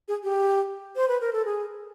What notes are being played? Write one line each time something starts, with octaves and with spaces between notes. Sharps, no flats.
G#4
G4
C5
B4
A#4
A4
G#4